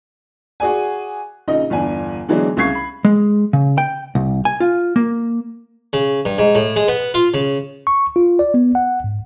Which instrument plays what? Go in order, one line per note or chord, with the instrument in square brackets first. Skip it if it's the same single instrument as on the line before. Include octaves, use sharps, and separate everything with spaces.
[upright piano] F#4 G#4 D5 G#5
A#1 C#3 D#4 D#5
G1 E2 D4 G#5
D3 E3 F#3 G#3 B3 D4
C2 C#3 F5 C#6 G#6 C7
B5
[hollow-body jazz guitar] G#3
C#3
G5
C2
G#5
F4
A#3
[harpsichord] C#3
G2
G#2
A2
G#3
B3
F4
C#3
[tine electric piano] C#6
F4
D5
B3
F#5
G#2